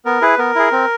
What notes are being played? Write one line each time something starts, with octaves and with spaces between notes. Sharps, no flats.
B3 A#4
E4 G#4 B4
B3 A#4
E4 G#4
C4